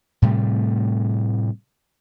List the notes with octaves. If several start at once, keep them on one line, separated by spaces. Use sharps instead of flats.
A2 C3 G3 A3